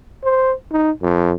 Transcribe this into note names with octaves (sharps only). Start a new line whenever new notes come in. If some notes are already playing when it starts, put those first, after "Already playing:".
C5
D#4
F2